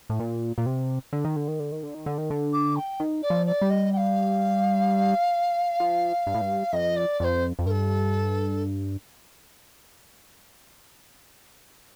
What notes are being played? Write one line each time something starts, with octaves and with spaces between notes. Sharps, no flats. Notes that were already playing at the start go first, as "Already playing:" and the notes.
A2
A#2
A#2
C3
D3
D#3
D3
D#3
D3
D#3
D3
D#3
D3
D#3
D3
D6
G5
D#3
D5
F3
D5
G3
D#5
G5
F5
F3
G2
A2
G2
F2 D#5
D5
F2 C5 D5
F2
G2 A4 A#4